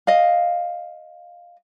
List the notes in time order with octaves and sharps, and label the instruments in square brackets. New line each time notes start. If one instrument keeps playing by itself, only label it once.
[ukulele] D#5 F5